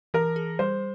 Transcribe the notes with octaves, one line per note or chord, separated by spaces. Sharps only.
E3 A#4
G#4
G3 C5